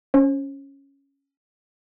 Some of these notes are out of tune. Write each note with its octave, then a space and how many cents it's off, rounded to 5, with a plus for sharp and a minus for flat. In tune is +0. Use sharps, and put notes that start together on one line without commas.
C#4 +0 C5 +40